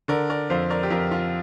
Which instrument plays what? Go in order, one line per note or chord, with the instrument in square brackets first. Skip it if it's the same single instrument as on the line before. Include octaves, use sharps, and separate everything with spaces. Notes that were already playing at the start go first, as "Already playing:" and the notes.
[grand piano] D3 A#4 D5
A#4 D5
F2 C5 F5
A#4 D5
G4
F2 F4 A#4
F4